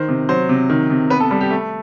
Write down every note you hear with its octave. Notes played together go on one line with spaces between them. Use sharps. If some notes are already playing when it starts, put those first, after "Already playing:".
Already playing: D#3 C5
C3
F#3 C5
C3
D#3
C3
B3 B4
A4
G3 A4
G4
A3